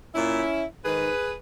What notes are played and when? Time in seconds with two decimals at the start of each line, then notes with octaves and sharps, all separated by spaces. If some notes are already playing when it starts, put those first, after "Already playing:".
0.14 A#2 C#4 E4
0.84 G#2 D#3 G#4 B4